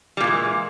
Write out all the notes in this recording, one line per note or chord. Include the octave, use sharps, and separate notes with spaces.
A#2 E3 G3 G#3